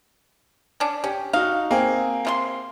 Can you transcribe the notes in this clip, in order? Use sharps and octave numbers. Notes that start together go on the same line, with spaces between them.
C#4 D4
C#4 G4
D#4 F#4 F5
A#3 C4 G#4
C3 F4 C6